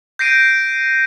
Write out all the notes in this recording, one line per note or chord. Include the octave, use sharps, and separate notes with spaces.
G6 A#6 C7 D7 D#7